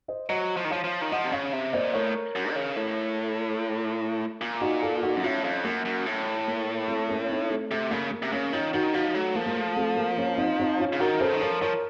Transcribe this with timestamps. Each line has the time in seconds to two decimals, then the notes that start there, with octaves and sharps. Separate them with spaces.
0.08 C5 D#5
0.29 F#3 C5 D#5
0.57 F3
0.65 D#3
0.70 F3 C#5 F5
0.84 F3
1.02 D#3
1.12 F3 D#5 F#5
1.25 C3
1.32 C#3 C#5 F5
1.53 C3
1.73 A#2 C5 D#5
1.94 A2 A#4 C#5
2.36 F#2
2.51 D#3
2.56 C#3
2.76 A2
4.41 A#2
4.61 D#4 F#4
4.83 F4 A4
5.03 D#4 F#4
5.17 F#2
5.23 A2 C#4 F4
5.44 F2
5.64 F#2 A#3
5.85 F#2
6.06 A2
6.48 A#3
6.88 A3 C4
7.09 A#3 C#4
7.29 C4 D#4
7.50 A3 C4
7.71 C3 A3
7.91 C#3 A#3
8.11 A#3
8.23 C3
8.32 C#3 A#3 C#4
8.53 D#3 C#4 F4
8.73 D#3 D#4 F#4
8.94 F3 D#4 F#4
9.14 F#3 A3
9.35 F3 A#3
9.46 A#3
9.56 A3
9.76 A3 C4
9.97 A#3
10.18 A#3 C#4
10.38 C4 D#4
10.59 C4 D#4
10.80 C#4 F4
10.93 C#3
11.00 D#3 F#4 A#4
11.21 C#3 A4 C5
11.32 D#3
11.41 F3 A#4 C#5
11.61 F3 A#4 C#5